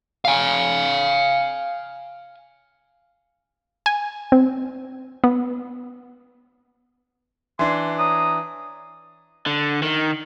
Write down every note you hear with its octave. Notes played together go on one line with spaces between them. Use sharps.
F5 G#5
G#5
C4
B3
E3 D4 C6
C#5 A#5 D#6
D3
D#3